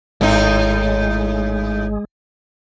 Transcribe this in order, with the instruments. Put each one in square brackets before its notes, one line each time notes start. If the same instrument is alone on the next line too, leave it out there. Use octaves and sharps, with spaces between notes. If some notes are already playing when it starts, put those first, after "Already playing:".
[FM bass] G#1 [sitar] A2 D#4 [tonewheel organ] G#3